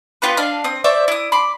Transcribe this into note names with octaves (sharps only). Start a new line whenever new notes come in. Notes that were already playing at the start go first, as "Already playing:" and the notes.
B3 F4 G4 B4
D4 D#5 F5
C4 D#6
C5 D5 E5 C#6
E4 D#6
B5 C6 D6